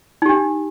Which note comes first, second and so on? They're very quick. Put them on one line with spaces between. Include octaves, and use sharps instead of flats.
D#4 G4 D4